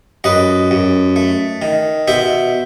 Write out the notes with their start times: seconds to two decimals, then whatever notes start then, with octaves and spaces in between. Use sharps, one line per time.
0.24 F#2 B4 D#5
0.71 F#2
1.16 A3
1.62 D#3
2.08 B2 C5 E5